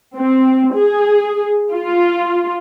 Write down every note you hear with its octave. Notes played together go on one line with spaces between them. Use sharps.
C4
G#4
F4